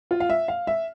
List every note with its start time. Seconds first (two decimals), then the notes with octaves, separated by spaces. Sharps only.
0.11 F4
0.20 F5
0.30 E5
0.48 F5
0.67 E5